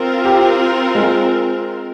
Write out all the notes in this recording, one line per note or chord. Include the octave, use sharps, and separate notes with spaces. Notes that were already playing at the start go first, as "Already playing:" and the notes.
Already playing: C4 F4 A#4
G4
G#3